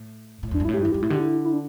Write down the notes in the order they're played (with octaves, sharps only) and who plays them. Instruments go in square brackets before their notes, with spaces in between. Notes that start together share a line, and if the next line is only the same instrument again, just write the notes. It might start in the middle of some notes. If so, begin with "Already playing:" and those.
Already playing: [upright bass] A2
A2
[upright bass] E2 [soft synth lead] D4
[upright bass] G2
[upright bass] A2 [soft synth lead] E4
[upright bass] G2 [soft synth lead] G4
[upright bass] E2 [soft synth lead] E4
[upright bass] G2 [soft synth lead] G4
[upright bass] A2 [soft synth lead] E4
[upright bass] D3 [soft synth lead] G4
[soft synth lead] E4
E4
D4